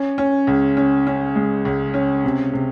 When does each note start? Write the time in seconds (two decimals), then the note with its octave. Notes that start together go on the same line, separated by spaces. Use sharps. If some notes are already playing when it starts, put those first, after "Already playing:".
Already playing: C#4
0.18 C#4
0.47 C#2
0.77 C#4
1.07 C#4
1.35 G#3
1.65 C#2
1.94 C#4
2.24 C3
2.53 C3